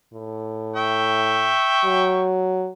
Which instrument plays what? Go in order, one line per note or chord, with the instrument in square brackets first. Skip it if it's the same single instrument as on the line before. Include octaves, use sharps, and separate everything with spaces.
[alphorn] A2
[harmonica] E5 G5 C#6
[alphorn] F#3